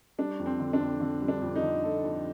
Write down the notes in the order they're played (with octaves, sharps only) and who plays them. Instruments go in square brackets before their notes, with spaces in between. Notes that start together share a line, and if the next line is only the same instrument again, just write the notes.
[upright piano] G3 D4
F2
C4
D3
D4
F2
D3
G3
D4
F2
D#4
D3
F2 A4
F2